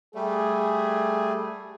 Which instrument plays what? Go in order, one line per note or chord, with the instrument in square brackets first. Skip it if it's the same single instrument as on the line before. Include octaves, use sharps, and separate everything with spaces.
[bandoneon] G3 A3 [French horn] G#4